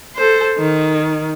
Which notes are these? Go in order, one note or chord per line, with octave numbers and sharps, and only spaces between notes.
A4 C5
D#3